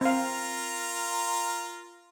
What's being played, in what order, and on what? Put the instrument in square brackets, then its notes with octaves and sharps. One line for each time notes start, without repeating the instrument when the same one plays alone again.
[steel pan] C4 F5 [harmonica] F4 A#4 A#5